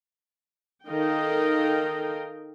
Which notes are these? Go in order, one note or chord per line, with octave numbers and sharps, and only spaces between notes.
D#3 A4 A#4 D#5 F5 G5